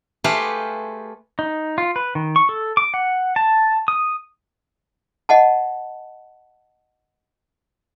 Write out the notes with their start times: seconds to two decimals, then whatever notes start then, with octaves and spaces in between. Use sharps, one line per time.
0.24 A3 G4 G#4 B4 C5 F5
1.39 D#4
1.78 F4
1.96 B4
2.15 D#3
2.36 C#6
2.49 A4
2.77 D6
2.94 F#5
3.36 A5
3.88 D#6
5.29 D#5 F#5 A5